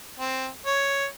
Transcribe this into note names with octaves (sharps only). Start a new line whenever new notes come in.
C4
C#5